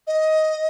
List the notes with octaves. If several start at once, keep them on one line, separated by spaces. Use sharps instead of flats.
D#5